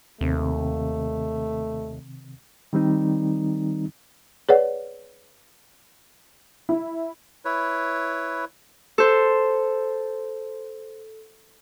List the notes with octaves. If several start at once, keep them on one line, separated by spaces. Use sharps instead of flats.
D#2 C3 D#3 A3 C4
D#3 G3 C4 D#4
G#4 B4 C#5 D5 F#5
E4
E4 B4 C#5
A4 C5